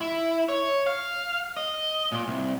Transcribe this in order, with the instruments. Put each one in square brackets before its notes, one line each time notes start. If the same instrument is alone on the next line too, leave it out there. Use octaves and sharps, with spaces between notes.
[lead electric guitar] E4
C#5
F5
D#5
A#2
C2